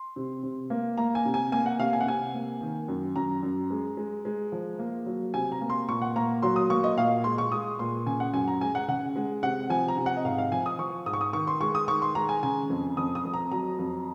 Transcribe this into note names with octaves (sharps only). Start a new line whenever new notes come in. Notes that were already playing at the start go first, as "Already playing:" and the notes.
Already playing: C6
C3
C3
A#3
A#3 A#5
G#5
C3
G#5
A#3 G#5
F#5
C3 F5
G#5
F#5
C3 G#5
A#3
D#3
F#2
F#2 A#5
F#2
G#3
G#3
G#3
F3
A#3
F#3
C3 G#5
A#5
A#3
C6
A#2 C#6
F#5
A#3 A#5
F#3 C6
D#6
A#3 C#6
D#5
A#2 F5
G#3 C6
C#6
G#3 D#6
A#2 C6
C#3 G#5
F#5
F#2 G#5
A#5
G#3 G#5
F#5
C#3 F#5
G#3
C3 F#5
F3 G#5
A#5
C3
F#5
D#5
G#2 F5
F5
F3 G#5
D#6
F3 C#6
G#2 D#6
C#6
D#6
D#3 C#6
C6
G#3 C#6
D#6
D#3 C#6
C6
G#3 A#5
G#5
C#3 G#5
F2
F2 D#6
D#6
F2
A#5
F#3 A#5
F2